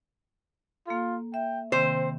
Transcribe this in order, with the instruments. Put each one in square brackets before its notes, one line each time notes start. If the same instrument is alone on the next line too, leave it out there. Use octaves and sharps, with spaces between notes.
[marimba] A#3 A4 [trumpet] F4
[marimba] E5 [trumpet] G5
[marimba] C3 D#3 A#3 [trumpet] C4 [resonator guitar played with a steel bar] C5